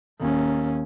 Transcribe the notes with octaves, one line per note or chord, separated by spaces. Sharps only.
D#2 C#4